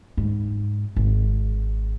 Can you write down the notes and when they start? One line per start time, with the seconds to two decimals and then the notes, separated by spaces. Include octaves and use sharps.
0.17 G#2
0.96 G#1